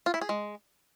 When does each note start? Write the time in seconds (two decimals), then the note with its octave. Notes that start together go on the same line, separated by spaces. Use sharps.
0.06 F4
0.14 E4
0.21 G#4
0.29 G#3